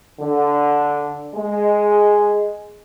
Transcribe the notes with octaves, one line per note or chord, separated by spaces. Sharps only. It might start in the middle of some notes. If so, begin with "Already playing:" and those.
D3
G#3